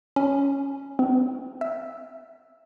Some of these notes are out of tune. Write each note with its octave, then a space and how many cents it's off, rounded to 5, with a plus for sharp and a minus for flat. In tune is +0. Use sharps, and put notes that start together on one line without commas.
C#4 +0
C4 -40
E5 -5